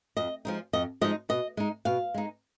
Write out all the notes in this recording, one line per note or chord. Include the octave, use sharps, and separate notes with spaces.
F2 D#5
F3 G#3 D#4
F2 D#5
F3 G#3 D#4 D#5
B2 D#5
G#3 D#4
B2 F5
G#3 D#4